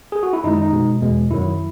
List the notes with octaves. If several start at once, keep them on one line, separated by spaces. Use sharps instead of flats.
G#4
F#4
E4
F#2 D#3 G#3 D#4
D#4
B2 G#3
E2 B2 G#3
F#2 D#3 F#3 E4